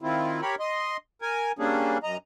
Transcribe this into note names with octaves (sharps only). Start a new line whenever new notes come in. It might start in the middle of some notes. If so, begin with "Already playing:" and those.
D#3 C4 E4 F4
G4 A#4 C#5 B5
D#5 C6
A#4 G#5
G3 A#3 C#4 D4 G#4
F#2 D#5 A#5